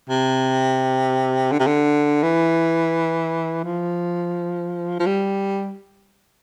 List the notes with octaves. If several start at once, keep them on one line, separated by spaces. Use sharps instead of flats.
C3
D3
C3
D3
E3
F3
F3
G3